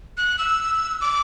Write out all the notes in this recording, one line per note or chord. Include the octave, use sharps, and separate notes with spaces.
F#6
E6
D6